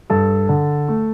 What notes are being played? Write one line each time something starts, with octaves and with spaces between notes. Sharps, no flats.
G2 A4 A5
D3
A3